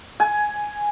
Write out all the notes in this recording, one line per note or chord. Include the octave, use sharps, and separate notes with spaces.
G#5